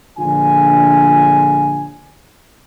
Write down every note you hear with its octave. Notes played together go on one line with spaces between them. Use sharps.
A#1 D3 F4 G#5